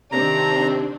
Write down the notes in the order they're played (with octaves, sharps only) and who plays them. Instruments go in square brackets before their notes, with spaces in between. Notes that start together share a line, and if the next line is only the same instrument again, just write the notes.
[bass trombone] C3 [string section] D#3 C4 D4 [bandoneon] A#5